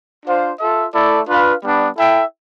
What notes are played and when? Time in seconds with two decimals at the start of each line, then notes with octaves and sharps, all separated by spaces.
0.25 D4 F4 C5 F5
0.59 F4 A4 E5
0.93 A3 E4 A4 D5
1.27 D4 F4 B4 F5
1.61 G3 B3 D4
1.96 E4 A4 E5 G5